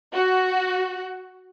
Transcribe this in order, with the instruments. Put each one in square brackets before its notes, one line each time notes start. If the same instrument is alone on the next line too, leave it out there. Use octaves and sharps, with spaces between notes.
[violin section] F#4